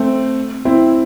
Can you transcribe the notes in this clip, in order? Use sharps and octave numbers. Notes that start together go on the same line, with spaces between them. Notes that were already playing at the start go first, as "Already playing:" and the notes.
Already playing: A3 C4
C4 E4